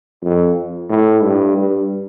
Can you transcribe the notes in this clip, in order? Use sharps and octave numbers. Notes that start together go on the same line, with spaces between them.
F2
A2
G2
G2